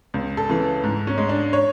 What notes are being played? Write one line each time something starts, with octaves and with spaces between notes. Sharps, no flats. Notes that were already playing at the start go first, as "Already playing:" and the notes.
C#2
A4
C#3 E3
G#2
C#4
G#3
D4
C#5